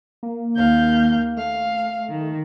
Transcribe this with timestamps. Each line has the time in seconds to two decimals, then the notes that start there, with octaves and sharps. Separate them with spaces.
0.23 A#3
0.57 D#2 F5 G6
1.37 A3 F5
2.08 D#3